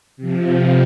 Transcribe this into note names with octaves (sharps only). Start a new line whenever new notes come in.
C3 F3